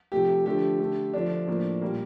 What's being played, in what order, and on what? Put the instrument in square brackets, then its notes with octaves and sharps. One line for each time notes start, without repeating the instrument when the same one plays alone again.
[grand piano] C3 F3 A3 G4
D3 F3 A3 G4
D3 A3
D3 F3 A3 D4
A2 F3 A#3
A#2 G3 A#3